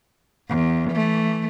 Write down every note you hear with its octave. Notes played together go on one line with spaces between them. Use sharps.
E2
E3 A3